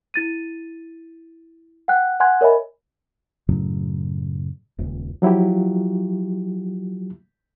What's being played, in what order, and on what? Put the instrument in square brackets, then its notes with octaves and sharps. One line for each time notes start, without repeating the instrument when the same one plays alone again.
[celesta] E4 A6 D#7
F#5 G5 F#6
F#5 G#5 C6 F#6 G#6
A#4 C#5 D#5 E5 G#5 B5
[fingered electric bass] F#2 A2 C#3 F#3
D#1 C#2
[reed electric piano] F3 F#3 E4 F4 G4